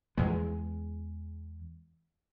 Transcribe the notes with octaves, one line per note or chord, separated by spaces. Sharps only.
E2 G#3